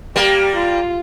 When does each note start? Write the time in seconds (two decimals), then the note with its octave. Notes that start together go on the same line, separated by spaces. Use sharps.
0.16 G3 A#3 G4
0.55 F4